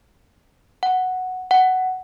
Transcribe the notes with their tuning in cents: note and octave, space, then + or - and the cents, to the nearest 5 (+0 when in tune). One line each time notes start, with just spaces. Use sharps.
F#5 +0
F#5 +10